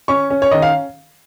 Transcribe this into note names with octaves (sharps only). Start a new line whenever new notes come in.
C#4 C#6
C#4
C#5
D#3 D#5
F5